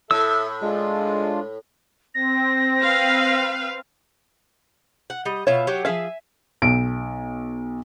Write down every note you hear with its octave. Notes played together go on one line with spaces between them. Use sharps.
A2 A4 E5 E6
G#3 D4 F4
C4 A#6
B4 F5
F#5
G3 D#5
B2 F4 C#5 E5
F#3 G4
F3 G#4 E5 F5 G#5
B1 D7